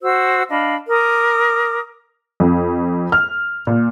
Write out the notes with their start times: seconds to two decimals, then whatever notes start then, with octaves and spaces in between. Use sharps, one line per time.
0.02 F#4 C5 E6
0.49 D4 D#5 F5 B5
0.89 A#4 D6 D#6
2.40 F2
3.12 F6
3.67 A#2